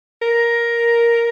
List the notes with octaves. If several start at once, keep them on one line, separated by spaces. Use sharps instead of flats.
A#4